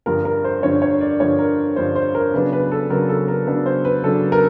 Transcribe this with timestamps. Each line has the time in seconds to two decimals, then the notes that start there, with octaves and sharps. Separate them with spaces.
0.06 G2 D3 F3 A#4
0.25 A#4
0.44 C5
0.63 G2 D3 F3 C#5
0.82 C#5
1.01 D5
1.20 G2 D3 F3 C#5
1.39 A#4
1.76 G2 D3 F3 C5
1.95 C5
2.15 A#4
2.34 C#3 F#3 B3 D4 B4
2.53 B4
2.72 A4
2.90 C#3 F#3 B3 D4 A#4
3.09 A4
3.28 A#4
3.47 C#3 F#3 B3 D4 B4
3.66 C5
3.85 B4
4.04 C#3 F#3 B3 D4 A4
4.32 A#4